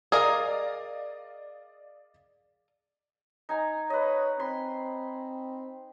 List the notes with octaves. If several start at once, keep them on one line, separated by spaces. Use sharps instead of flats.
G#4 A#4 D5 D#5 F5
D#4 G#5 A#5
B4 C#5 D#5
C4 B5 C6